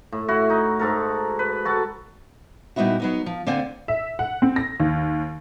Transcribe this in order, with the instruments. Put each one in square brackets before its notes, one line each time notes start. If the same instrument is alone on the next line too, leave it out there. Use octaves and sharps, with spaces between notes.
[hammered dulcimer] A2
E4 F#4
D#4
G#2 A4 A#4
B4
F#4 A4 A5
[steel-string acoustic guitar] A#2 G3 B3 D#4 E4 F#4
F#3 B3 D#4
F3
D3 A#3 C4 D5 F#5 G#5
[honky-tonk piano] E5
F#5
C4
A#6
D#2